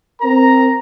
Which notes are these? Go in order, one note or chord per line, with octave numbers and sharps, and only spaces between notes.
C4 A#4 A#5